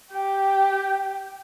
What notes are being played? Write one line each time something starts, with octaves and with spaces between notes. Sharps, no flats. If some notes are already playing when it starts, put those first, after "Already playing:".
G4 G5